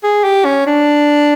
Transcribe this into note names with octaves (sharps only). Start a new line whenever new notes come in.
G#4
G4
C#4
D4